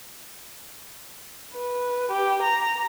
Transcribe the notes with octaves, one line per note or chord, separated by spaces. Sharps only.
B4
G4
A#5